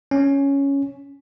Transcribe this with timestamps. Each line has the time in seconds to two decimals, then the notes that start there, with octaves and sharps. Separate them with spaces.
0.11 C#4